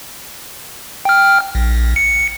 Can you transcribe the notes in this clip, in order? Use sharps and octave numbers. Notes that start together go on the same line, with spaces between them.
G5 F6
A#1
C#7